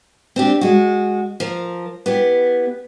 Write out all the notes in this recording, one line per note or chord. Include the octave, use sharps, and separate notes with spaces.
C4 D4 G4
G#3 F#4
F3 A#4
B3 E4 G4